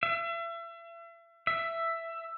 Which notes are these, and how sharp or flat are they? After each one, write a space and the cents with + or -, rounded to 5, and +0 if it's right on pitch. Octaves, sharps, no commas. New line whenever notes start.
E5 +35
E5 +10